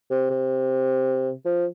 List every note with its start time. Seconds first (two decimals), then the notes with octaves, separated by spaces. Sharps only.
0.10 C3
0.30 C3
1.45 F3